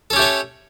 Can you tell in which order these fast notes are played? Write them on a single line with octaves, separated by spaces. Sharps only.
A4 C#4 G4 A3 C#5